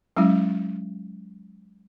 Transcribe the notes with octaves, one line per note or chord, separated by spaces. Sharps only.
F#3 G#3 C#4 E4